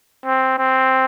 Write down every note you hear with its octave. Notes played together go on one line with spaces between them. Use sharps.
C4
C4